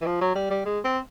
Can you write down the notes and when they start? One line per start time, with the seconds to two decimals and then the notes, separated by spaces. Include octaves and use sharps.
0.02 E3
0.06 F3
0.21 F#3
0.35 G3
0.50 G3
0.65 G#3
0.85 C4